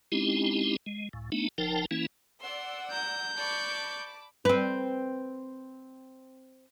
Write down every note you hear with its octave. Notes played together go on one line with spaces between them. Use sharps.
G#3 C4 C#4 D#4 E4 G4
G#3
C#2 A2
A3 B3 D4 D#4
F#1 F3 D#4 A#4 G5 A5
E3 A#3 C#4 E4
D5 F#5 C6 E6
A#5 G6
D5 A5 B5 C#6 D6
C4 B4